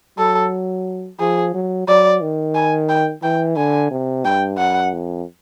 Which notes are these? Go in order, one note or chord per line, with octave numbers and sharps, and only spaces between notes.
F#3 A4
F3 G#4
F#3
F#3 D5
D#3
G#5
G5
E3 G5
D3 G#5
C3
G2 G5
F#2 F#5
F2